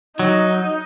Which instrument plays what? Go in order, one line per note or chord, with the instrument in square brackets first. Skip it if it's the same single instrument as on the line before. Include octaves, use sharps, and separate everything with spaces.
[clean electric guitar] F#3 [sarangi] D#4